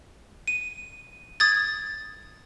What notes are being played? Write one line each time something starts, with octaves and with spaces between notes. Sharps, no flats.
D#7
D#6 G#6 A6